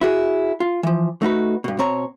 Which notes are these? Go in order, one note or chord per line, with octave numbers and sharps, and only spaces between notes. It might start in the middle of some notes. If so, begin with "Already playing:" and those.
E4 F#4 G#4
F4
E3 F3
A3 D#4 F#4 B4
G2 B2
B2 C4 C#5 A#5